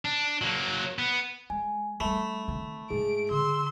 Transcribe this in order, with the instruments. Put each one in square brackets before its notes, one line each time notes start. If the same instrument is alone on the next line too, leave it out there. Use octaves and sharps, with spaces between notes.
[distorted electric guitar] D4
F#3 A#3
B3
[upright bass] G#3 [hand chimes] G#5
[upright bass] G3 C#4 [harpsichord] A3 [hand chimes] B5
[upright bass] D#3 C4
[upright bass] G#2 G#3 [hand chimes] G#4 [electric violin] D7
[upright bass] D3 [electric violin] C6 E6